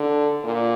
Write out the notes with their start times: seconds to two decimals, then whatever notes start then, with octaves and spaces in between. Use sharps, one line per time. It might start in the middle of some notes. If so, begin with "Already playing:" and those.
Already playing: D3
0.44 A#2